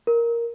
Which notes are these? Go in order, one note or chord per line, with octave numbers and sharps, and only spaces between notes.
A#4